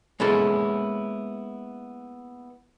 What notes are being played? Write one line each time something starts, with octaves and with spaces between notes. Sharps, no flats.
G#3 A#3 B3 C#4 E4 A4